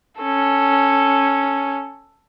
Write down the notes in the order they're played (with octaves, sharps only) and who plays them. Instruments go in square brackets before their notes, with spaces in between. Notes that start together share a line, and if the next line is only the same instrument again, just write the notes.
[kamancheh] C#4 A4